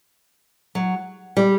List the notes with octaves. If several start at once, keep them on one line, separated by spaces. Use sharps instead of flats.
F#3
G3